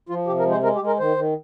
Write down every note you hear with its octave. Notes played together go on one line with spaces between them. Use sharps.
F3 F4
C3 G4
A#4
G#3
C5
G#3 A#4
G4
G#3
A#4
D#3 C5
D#3